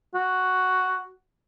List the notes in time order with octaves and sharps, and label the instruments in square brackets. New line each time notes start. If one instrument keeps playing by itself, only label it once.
[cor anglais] F#4